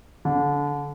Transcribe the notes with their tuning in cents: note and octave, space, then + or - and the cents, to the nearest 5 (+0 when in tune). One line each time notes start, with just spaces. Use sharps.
D3 -25